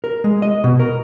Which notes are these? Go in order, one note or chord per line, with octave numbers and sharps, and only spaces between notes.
A#4
G#3
D#5
B2
A#4